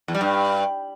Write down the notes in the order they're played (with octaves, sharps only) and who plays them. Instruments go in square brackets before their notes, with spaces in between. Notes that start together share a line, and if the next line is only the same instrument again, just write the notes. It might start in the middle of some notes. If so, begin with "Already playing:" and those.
[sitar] E2
G3
G2